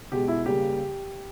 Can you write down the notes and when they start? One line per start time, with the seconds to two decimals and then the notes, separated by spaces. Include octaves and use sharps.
0.12 B2 G#3 G4
0.28 E4
0.46 C#3 G3 A#3 G4